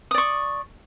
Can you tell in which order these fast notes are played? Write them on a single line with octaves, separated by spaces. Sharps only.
D#6 D5 C#6